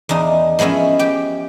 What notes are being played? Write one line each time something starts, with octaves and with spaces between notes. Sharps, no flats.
E2 D4 D#4
F3 G#3 B3 C#4 E4
G4 G5